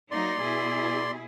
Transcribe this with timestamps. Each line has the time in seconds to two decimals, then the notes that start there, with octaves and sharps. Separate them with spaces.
0.11 F#3 A#3 D#4 D5 C6
0.42 B2 E4 G#4